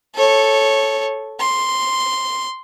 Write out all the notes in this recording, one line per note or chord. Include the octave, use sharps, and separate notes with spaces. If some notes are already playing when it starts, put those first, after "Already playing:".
A4 C#5
C6